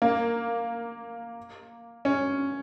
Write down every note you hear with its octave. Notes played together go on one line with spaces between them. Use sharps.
A#3
C#4